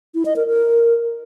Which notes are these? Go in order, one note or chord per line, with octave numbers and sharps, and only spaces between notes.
E4
D#5
A#4
A#4